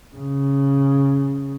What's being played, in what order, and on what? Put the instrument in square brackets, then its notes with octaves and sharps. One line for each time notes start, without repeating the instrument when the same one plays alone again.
[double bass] C#3